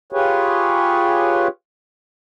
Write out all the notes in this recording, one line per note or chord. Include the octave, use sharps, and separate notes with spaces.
F4 G4 G#4 B4 C#5